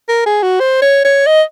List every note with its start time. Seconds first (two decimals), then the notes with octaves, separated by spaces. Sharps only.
0.09 A#4
0.26 G#4
0.43 F#4
0.60 C5
0.82 C#5
1.05 C#5
1.27 D#5